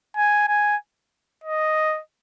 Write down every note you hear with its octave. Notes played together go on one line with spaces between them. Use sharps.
G#5
G#5
D#5